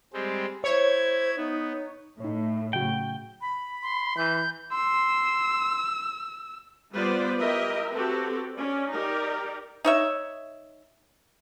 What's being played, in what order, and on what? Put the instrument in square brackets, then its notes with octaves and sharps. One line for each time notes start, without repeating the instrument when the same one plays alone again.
[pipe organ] G3 G#3 C4
[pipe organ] E4 G#6 [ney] C5 [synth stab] C#5
[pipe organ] B3 [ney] D#4
[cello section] A2 [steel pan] D#4 E4 C#5
[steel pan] C#3 F#3 F#4 [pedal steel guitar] G5
[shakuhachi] B5
[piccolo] C6
[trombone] E3 [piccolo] G6
[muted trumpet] C6 [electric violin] E6
[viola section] G3 B3 F4 B4 C5 D5
E4 G4 A#4 D#5 E5
C4 F#4 G4 A4 B4
C#4 D5
D#4 G4 A#4 D5
[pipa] D#4 C#5 E5